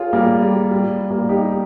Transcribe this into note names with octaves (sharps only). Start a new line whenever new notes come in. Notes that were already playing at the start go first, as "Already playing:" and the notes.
Already playing: F4 G#4 A#4 C#5
G3 A#3
G3
G3
G3 A#3
D#4 G4